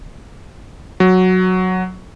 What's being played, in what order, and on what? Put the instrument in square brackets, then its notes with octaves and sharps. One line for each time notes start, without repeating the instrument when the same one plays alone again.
[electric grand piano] F#3